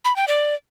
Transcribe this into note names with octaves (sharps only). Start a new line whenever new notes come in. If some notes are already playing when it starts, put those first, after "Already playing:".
B5
G5
D5